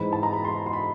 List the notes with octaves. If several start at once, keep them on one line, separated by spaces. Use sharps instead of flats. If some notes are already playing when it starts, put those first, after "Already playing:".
Already playing: G#2 E3 G#3 C4 B5
A5
A#5
B5
C6
C6
B5